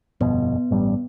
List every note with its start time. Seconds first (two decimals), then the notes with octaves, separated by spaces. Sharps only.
0.21 G1 F2 B2 B3
0.71 A1 G2 G3